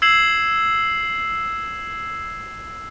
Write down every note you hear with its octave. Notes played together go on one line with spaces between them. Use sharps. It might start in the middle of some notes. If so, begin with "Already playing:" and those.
E6 G#6 C7 E7 F#7